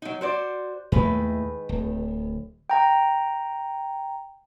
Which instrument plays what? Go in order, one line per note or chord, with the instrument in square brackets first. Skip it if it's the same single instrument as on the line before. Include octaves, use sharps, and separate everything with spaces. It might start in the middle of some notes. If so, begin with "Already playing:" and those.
[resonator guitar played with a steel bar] F#3 D#4
F#4 C5 D5
[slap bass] D#2 A2 A3 [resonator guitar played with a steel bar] D#3 G#3 B4
[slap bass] D1
[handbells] G5 A#5